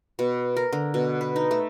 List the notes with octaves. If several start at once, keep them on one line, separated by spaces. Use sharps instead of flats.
B2
A#4
D3
B2
B4
D#4
A3